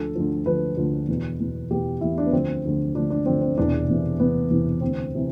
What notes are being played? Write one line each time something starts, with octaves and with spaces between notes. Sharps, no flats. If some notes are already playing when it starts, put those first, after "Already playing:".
Already playing: D2 D3 F3 A4
D2 D3 F3
D2 D3 F3 B4
D2 D3 F3
E2 B2
E2 B2
E2 B2 G4
E2 B2 E4
D4
B3
D2 D3 F3 C4
D2 D3 F3
D2 D3 F3 D4
D4
D2 D3 F3 C4
C4
E1 E2 C3 E3 D4
E1 E2 C3 E3
E1 E2 C3 E3 B3
E1 E2 C3 E3
D2 C3 E3 C4
C3 E3